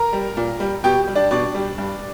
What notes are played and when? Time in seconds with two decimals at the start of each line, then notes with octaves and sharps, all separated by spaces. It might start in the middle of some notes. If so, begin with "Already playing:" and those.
Already playing: A#4 A#5
0.13 G3
0.37 A#2
0.60 G3
0.84 B2 G4 G5
1.07 G3
1.15 D4 D5
1.31 B2 D4 D5
1.55 G3
1.78 G2